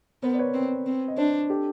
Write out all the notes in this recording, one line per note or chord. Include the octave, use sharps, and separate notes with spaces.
B3 A#4 C5
D5
B4 C#5
C4
C4
D#5
D4 C5 D5
G4 A4